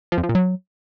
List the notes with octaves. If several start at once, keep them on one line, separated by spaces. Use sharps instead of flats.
F3
F2
F3
A#2
F#3